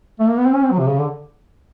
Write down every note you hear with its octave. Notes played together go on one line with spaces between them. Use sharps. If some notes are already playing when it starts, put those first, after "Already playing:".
A3
A#3
B3
C4
C#4
C4
F#3
C3
C#3
D3